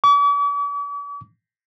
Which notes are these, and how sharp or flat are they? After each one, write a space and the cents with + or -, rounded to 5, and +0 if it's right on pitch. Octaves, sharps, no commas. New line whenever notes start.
D6 -45